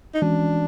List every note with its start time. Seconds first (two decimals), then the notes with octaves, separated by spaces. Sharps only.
0.14 D#4
0.22 E3 G#3 C#4 D4 F#4